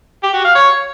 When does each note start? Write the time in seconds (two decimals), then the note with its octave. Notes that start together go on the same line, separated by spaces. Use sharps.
0.23 G4
0.34 F#4
0.45 F5
0.55 C#5